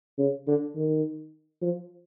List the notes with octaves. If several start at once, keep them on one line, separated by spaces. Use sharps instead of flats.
C#3
D3
D#3
F3